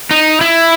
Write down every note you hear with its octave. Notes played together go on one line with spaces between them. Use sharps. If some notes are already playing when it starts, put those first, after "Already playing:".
D#4
E4